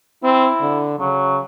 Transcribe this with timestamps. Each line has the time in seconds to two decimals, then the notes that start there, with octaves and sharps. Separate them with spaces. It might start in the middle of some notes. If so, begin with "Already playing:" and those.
0.23 C4 E4
0.61 D3
0.99 C#3 F#3